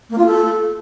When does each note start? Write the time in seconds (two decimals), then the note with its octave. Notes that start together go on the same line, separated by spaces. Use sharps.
0.10 A#3
0.18 F4
0.26 A4